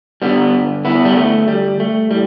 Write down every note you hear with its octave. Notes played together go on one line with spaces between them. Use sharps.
G2 D3 G3 B3
B3 E4
G3
A3
G3
A3
A2 G3